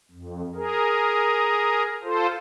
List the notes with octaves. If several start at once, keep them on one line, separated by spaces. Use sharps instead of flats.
F2
G#4 A#4
F4 A4 C5